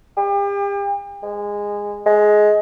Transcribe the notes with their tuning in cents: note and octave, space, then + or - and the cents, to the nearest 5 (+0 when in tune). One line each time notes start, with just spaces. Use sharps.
G4 +40
G#3 -15
G#3 +15